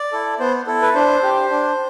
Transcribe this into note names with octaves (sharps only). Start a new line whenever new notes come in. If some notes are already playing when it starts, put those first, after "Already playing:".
Already playing: D5
E4 A4
B3 C5
E4 A4
B4
D4 C5
G4
D4